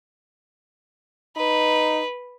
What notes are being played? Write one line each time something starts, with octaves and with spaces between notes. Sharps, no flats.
D#4 B4